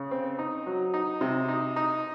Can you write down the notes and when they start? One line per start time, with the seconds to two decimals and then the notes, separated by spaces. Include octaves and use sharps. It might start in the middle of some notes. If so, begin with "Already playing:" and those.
Already playing: C#3
0.11 C4
0.39 D#4
0.66 F#3
0.94 D#4
1.21 C3
1.49 D#4
1.76 D#4